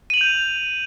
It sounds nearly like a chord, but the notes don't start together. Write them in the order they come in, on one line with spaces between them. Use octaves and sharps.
D#7 F#7 F7 G6